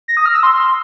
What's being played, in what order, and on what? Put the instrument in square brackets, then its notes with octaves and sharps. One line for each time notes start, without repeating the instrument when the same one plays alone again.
[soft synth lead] A#6
D#6
F6
E6
C6